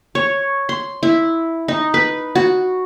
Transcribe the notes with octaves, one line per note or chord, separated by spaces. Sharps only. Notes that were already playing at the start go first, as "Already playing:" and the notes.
C#5
C6
E4
D#4
B4
F#4